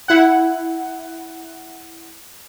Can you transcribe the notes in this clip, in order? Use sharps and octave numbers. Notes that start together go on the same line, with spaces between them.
E4 F#5